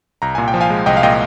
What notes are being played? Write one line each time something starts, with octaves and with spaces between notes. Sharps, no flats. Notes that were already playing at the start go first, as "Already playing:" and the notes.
C2 A#5
A#2 G#5
G5
F3
F5 G#5
G#3
C2 D#5 G5
F5
A#2 D#5 G5